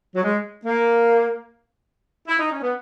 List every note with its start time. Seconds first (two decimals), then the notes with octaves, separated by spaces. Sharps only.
0.15 F#3
0.23 G#3
0.65 A#3
2.28 E4
2.39 D#4
2.51 C#4
2.62 B3